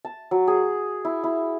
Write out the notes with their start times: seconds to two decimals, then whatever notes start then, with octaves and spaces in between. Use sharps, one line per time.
0.05 A5
0.31 F#3
0.48 G#4
1.05 E4
1.24 E4